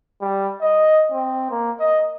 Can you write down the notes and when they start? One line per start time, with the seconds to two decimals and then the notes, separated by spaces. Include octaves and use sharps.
0.21 G3
0.61 D#5
1.12 C4
1.50 A#3
1.80 D#5